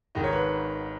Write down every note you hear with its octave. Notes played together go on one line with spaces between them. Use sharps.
G#1 G#2 D#3 D#5
C#5
B4